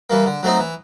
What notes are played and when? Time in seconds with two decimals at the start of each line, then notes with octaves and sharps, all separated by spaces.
0.10 E3 G3 A#3
0.26 D3
0.43 F#3 A3 C4 D#4
0.59 E3